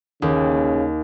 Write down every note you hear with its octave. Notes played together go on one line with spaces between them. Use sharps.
D#2 C#3